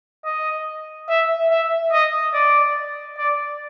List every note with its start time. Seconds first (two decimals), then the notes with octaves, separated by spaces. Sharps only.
0.25 D#5
1.09 E5
1.50 E5
1.92 D#5
2.34 D5
3.18 D5